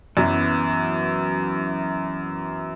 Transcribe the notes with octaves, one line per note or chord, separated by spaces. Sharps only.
F#2 E3 B3 E4